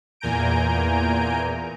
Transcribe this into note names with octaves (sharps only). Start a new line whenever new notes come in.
E2 A#2 G#5 A#5 G6 D7